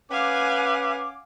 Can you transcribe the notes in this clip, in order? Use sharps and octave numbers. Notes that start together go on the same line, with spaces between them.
C#4 B4 F5 F#5 G#5 D6